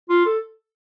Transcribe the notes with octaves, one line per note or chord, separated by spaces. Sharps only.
F4
A4